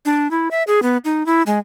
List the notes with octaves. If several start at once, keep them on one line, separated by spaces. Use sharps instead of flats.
D4
E4
E5
G#4
B3
D#4
E4
G#3